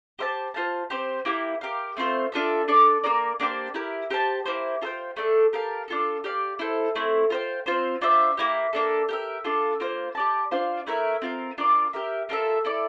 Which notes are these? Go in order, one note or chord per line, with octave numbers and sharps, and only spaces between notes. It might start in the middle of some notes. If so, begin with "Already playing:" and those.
G4 C5 E5 A5
F4 C5 F5 A5
C4 G4 C5
A#3 E4 G4
G4 A#4 F5
A3 C4 F4 C5
D4 F4 A4 E5
D4 A4 D5
A#3 F4 A#4 D5
A#3 D4 G4 C5
E4 G4 A#4
G4 C5 F5 A5
A#3 E4 G4 C5
F4 A4 C5 G5
A3 D4 A4
G4 A#4 F5 A5
D4 F4 A4
G4 D5 F5
E4 A4 C5
A3 C4 E4
F4 C5 G5
C4 F4 C5
D4 F4 C5 E5
A#3 E4 G4
A#3 D4 A4
G4 A#4 E5
D4 F4 A4
A#3 F4 C5
G4 D5 A5
D4 F4 C5 F5
A3 E4 A#4 E5
C4 F4 A#4
D4 F4 A#4 D5
G4 A#4 E5
A#3 F4 A4 E5
E4 A4 D5